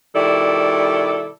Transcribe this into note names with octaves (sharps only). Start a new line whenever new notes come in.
B2 D#3 G3 E4 A4 D5